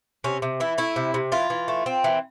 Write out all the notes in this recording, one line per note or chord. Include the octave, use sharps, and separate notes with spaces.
C3 C#4
C3
E3 E4
A3 E4
C3
C3
E3 F4
E3
A3
C4
E3